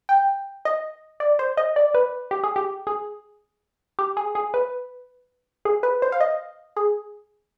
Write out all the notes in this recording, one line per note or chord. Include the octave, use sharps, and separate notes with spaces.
G5
D#5
D5
C5
D#5
D5
B4
G4
G#4
G4
G#4
G4
G#4
G#4
B4
G#4
B4
C5
F5
D#5
G#4